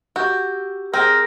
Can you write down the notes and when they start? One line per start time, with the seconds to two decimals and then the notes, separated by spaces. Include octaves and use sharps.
0.16 F#4 G4 E6 G6
0.94 C4 G#4 A#4 G5